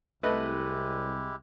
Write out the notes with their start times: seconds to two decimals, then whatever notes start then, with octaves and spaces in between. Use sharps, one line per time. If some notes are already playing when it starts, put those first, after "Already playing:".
0.23 C2 G#3 A3 E4 G4 B4 D#5